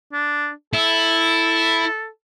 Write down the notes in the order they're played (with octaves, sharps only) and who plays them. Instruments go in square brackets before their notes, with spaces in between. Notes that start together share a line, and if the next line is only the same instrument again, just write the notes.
[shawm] D4
[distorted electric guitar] E4 [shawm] A4